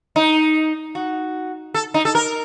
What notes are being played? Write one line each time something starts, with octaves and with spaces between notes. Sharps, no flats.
D#4
F#4
A4
D#4
A4
A#4